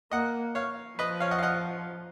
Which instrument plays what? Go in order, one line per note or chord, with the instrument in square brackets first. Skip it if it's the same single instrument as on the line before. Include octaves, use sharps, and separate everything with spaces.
[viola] A#3 [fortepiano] D#5 F#5
[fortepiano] C#5 F5
[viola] F3 [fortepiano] B4 D#5
[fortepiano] C#5 F5
D#5 F#5
F5
D#5 F#5